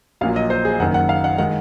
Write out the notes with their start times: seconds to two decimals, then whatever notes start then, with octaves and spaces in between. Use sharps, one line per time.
0.21 A#1 A#2 F#3 F5
0.36 D#5
0.50 C5
0.65 G#4
0.79 F#1 F#2 D#3 F#5
0.94 F#5
1.09 F5
1.24 F#5
1.38 D#3 G#3 F#5